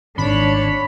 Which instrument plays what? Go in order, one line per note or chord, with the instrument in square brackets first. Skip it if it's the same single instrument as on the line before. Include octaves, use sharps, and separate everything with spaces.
[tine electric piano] G#1 [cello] D4 C#5 [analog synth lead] B5